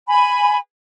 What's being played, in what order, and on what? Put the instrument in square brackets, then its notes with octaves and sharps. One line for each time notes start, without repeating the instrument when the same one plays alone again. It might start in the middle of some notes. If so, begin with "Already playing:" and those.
[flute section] G#5 B5